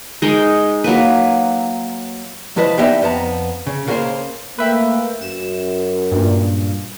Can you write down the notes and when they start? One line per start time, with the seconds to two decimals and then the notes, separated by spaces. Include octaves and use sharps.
0.22 G#3 D#4 A#4
0.84 F#3 A#3 B4
2.56 C2 F3 E4 B4 D#5 A5
2.78 E3 B3 D#4 G4 D5 E5
3.02 F2 B3 A5 A#5
3.67 C#3
3.87 C#2 C#3 A#3 F#4 A#4 C5
4.59 A3 A#3 B4 E5 G5
5.21 F#2 E7
6.12 G2 A#2